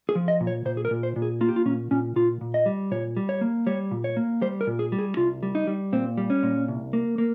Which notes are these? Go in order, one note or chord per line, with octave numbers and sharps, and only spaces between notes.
G#4
F3
D#5
A#2
C#5
A#2 C5
G#4
A#4
A#2
C5
A#2
G#4
A#3 F4
G4
F4
A#2 C#4
A#2 C#4
A#2 F4
A#2
D#5
G3
A#2 C#5
G3
C#5
A#3
G3 C#5
A#2
C#5
A#3
G3 C5
A#4
A#2
G#4
G3
G#4
C2 F4
G3
D#4
G3
A#2 C4
G3
C#4
A#2
C2
A#3
A#3